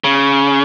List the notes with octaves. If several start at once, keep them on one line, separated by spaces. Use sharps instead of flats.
C#3